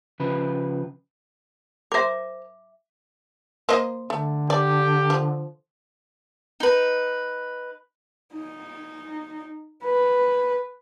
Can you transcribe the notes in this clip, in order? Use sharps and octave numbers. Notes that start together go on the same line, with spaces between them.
C#3 F3 B4
A#4 C5 E5 D6
A#3 C5 D#5
D3 A3
G4 D5
F3
D#4 B4
D#4
B4